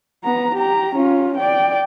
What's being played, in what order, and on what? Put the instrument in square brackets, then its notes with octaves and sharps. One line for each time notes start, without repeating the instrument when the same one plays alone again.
[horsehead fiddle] B3 A#5
G4 A#5
C#4 F4
D5 G5